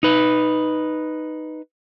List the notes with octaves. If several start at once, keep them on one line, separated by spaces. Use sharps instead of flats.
D#4 B4